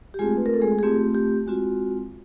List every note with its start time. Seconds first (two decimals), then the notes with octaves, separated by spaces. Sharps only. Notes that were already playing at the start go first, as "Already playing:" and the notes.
0.14 G4
0.19 G#3 A3 C4 F4 G#4
0.37 B4
0.46 A#4
0.54 A4
0.61 G#3 G#4
0.79 G#4
0.83 A3 C4 F4 G4
1.15 G4
1.46 G#3 C4 F4 F#4